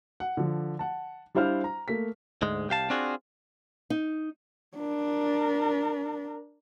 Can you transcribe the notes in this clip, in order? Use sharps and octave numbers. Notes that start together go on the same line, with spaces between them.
F#5
D3 F3
F#5 A5
G3 D4 E4 C5 F5 F6
A#5
A3 A#3 B6
D2 G#2 G#3
C2 G4 F5 A5
C4 D4 F4 F#4 G#4
D#4
D4 A#4